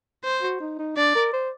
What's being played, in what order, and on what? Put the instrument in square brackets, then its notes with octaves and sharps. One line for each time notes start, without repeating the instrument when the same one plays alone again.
[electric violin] C5
[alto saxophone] F#4
D#4
D#4
[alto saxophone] D4 [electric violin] D5
[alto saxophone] A#4
C5